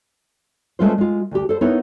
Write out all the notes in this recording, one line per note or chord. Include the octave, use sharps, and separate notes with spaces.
G#3 A3 C#4 F4 B4 C5
G#3 F4
D2 G4
A4 C5
B3 D#4 E4 A#4 B4 C#5